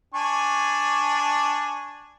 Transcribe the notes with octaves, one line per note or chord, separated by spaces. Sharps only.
D4 G#5 C#6